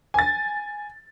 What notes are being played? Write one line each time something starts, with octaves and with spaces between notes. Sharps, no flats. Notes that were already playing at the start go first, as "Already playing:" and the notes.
G#5 A6